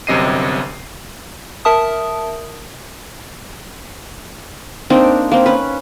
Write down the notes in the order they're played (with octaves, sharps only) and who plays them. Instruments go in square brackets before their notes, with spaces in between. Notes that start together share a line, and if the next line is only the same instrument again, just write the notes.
[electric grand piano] G1 F#2 C3 D#5 C7 D#7
[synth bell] A#4 E5 A5 D#6
[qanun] A#3 C4 D4 D#4
A#3 C4
C#4 B4